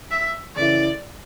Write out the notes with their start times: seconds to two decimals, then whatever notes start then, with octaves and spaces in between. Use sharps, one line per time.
0.11 E5
0.56 C#3 E3 A3 E4 D5